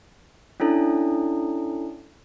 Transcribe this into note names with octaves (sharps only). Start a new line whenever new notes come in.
C#4 D4 E4 A4